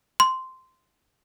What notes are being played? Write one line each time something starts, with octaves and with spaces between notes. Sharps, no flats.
C6